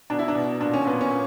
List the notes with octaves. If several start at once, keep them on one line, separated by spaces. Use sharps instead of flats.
B2 D4
E4
D4
B2
A#2 D4
C#4
A#2 B3
C#4
A#2